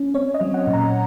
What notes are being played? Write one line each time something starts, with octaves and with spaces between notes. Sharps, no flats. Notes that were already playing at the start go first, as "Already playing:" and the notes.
Already playing: C#4
C4 C#5
D#5
F#3
F#5
A#2
A#5